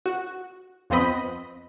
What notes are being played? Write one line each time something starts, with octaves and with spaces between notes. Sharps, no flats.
F#4
F2 F3 B3 C4 D#5 B5